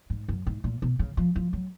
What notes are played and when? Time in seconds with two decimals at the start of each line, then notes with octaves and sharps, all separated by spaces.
0.10 G#2
0.29 F#2
0.47 G#2
0.64 A#2
0.82 B2
0.99 C#3
1.17 F3
1.36 F3
1.53 F#3